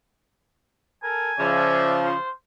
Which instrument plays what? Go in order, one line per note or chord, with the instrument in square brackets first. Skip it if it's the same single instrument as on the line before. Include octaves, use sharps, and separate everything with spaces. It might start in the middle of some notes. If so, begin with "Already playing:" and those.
[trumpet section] A4 A#4 [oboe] G#5
[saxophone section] C#3 F3 [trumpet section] D5 E5
[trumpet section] F4 C5